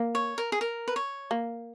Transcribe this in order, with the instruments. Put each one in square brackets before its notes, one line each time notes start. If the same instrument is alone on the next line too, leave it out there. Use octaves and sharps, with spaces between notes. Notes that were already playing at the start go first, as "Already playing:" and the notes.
Already playing: [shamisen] A#3
[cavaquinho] C#5
A#4
G#4
A#4
B4
C#5
[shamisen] A#3